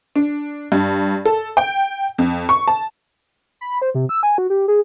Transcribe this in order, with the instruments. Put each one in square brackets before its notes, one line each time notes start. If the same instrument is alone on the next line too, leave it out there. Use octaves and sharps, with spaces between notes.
[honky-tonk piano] D4
G2
A4
G5
F2
C#6
A5
[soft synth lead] B5
C5
C3
E6
G#5
F#4
G4
G#4